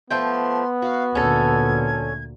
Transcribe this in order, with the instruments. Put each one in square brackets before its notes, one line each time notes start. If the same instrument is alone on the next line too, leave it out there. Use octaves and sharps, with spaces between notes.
[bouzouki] F3 A3 G5 [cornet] B3 [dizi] C6
[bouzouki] F#4 [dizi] F5
[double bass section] D2 A#2 [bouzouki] C#4 A4 [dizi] G#6